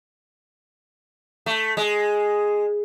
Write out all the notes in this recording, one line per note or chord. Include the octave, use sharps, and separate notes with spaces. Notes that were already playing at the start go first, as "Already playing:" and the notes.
A3
G#3